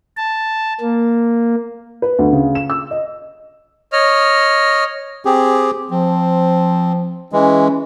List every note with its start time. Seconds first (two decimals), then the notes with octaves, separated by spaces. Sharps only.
0.17 A5
0.81 A#3
2.02 B4
2.19 D2
2.33 C#3
2.55 E7
2.70 E6
2.91 D#5
3.93 C#5 D#5 F6
5.25 C4 G4 G#4
5.90 F3 C4
7.32 E3 G#3 C#4